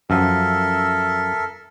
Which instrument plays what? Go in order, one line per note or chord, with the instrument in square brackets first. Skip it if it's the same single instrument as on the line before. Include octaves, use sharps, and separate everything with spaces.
[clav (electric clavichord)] F#2 F3 [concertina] A4 A#4 E5